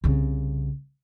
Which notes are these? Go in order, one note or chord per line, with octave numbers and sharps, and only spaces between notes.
C2 C#3